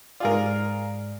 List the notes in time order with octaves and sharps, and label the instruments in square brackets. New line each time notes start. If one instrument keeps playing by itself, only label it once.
[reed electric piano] G#2 D5 [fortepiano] F4 G#4 A#4